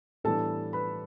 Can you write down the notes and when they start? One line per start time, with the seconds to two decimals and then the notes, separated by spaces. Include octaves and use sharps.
0.24 A2 E3 G3 B3 D4 A4 A5
0.73 B4 B5